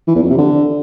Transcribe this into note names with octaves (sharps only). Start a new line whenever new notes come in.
E3
E2
F2
C3
D3